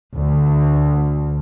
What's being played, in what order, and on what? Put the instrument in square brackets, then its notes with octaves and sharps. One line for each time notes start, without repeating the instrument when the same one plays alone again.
[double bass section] D2